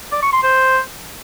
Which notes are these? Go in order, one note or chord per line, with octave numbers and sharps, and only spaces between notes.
D5
C#6
C6
C5